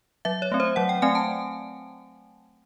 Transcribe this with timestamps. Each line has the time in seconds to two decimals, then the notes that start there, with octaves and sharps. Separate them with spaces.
0.25 F#3 E5
0.42 C#5
0.52 A3 C4
0.60 C5
0.76 F#3 F#5
0.89 G5
1.02 A3 C4 G#5
1.15 A5